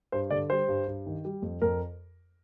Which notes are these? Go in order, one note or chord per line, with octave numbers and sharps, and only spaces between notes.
G2 C5
D3 D5
G3 C5
G2
G2
D#3
G3
F2
F2 A#4